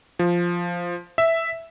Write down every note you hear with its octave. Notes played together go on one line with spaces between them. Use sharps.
F3
E5